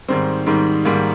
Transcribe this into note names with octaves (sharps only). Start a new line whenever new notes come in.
G#2 D#3 G3 C4
G#2 D#3 G3
G#2 D#3 G3 A#3